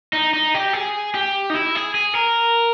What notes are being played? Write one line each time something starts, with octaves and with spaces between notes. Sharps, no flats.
D#4
D#4
G4
G#4
G4
D#4
E4
G#4
G#4
A#4